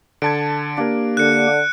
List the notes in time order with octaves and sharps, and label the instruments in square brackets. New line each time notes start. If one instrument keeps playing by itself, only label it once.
[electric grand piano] D3 A5 G#6 [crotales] D7
[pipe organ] A#3 G4 [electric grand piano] D4 A#4
[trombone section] D3 [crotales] F#6 C#7